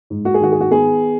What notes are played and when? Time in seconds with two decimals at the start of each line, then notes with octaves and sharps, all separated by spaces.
0.10 G#2
0.25 F#4
0.34 G#4
0.40 D#3 F#4
0.52 G#4
0.60 F#4
0.71 B3 G#4